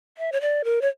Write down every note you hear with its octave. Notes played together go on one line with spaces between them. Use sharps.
E5
C#5
D5
A#4
C#5